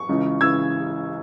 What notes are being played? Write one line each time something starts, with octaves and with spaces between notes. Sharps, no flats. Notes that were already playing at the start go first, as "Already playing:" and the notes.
Already playing: C#6
C#2 C#3 E3
C#3 E3 E6 G#6